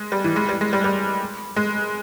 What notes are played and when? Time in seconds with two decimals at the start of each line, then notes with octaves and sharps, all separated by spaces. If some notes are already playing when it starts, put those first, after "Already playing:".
Already playing: G#3
0.12 G3
0.24 E3
0.36 G#3
0.49 G3
0.61 G#3
0.73 G3
0.84 G3
1.57 G#3